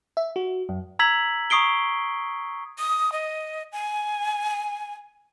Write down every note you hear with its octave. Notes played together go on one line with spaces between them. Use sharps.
E5
F#4
F#2
A#5 E6 G#6 B6 F#7
A#5 C#6 D#6 C7 D7 G7
D#6
D#5
G#5